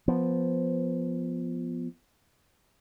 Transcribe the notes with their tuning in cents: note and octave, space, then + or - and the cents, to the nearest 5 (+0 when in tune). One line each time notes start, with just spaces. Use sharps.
F3 +0 B3 +0